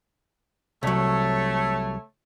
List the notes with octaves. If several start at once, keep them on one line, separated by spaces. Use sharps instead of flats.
C2 F#3 A3 C#5